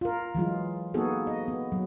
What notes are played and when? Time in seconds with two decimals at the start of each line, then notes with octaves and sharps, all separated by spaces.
0.01 F4 A#4
0.35 E3 F#3 G#3 F4
0.94 A#3 B3 D#4 F#4 G#4 A4
1.27 D#5
1.48 B3
1.72 F#3